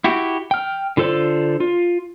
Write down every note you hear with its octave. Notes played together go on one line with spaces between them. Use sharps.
E4 F#4 G4
G5 F6
D3 F4 A4 C5 D5
F4